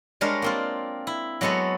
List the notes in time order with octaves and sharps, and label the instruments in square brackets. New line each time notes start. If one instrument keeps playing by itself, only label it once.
[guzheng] G3 G#3 D4 A#4 C#5 F5
A#3 C4 F4
E4
F#3 G#3 B3 A4 C#5